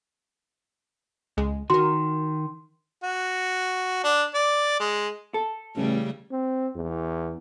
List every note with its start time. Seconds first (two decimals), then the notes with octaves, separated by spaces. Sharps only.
1.37 C#2 G#3
1.70 D#3 F#4 A#4 C6
3.03 F#4
4.04 D4
4.34 D5
4.80 G#3
5.34 A4
5.76 A1 C#3 G3 A3
6.31 C4
6.75 E2